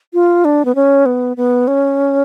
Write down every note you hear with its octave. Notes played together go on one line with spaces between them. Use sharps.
F4
D4
B3
C#4
B3
B3
C#4